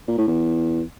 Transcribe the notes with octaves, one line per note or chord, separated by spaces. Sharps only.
A#2
A2
E2